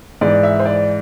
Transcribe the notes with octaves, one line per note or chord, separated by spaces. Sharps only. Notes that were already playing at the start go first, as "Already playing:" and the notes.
G#2 E3 D5
E5
C5
D5